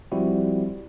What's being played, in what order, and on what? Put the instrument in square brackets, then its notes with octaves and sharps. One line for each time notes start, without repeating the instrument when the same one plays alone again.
[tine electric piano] F3 G3 C4 E4 F#4